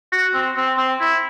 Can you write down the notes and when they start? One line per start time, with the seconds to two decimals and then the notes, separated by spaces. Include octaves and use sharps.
0.12 F#4
0.34 C4
0.56 C4
0.77 C4
1.00 E4